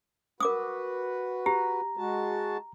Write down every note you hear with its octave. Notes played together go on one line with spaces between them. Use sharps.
F#4 A#4 B4 D6 D#6
G4 A#5
G#3 F#4 A5